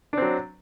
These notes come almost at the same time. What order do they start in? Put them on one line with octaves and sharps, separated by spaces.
D4 C4 F#3